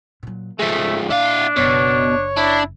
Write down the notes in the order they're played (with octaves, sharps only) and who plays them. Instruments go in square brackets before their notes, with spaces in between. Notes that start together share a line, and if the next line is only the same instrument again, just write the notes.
[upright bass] A#2 F#3
[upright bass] F1 [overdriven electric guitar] F3 G#3 [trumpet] A3
[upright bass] A#2 [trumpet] D4 [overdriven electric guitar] E4 F5
[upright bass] F#1 F#2 [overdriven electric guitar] B2 [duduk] C#5
[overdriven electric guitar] D4 [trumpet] E4